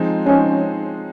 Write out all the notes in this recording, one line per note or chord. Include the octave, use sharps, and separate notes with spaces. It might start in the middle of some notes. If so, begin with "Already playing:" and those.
Already playing: F3 G#3 C4 D#4 G#4
F3 G#3 C4 C#4 D#4 G#4